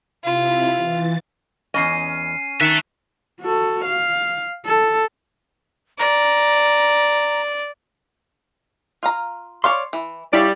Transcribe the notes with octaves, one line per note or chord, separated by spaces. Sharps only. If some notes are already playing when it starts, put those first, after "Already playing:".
C3 E4 F4
E3 A6
E2 G3 C#4 D#5 C7 D#7
D#3 E5 A5 F#6 C#7 E7
F#4 A4
F5
A4
D5 A#5
F4 F5 A#5
C#5 D5 F5 C6
E3
G3 C#4 E4 D5 E5 F5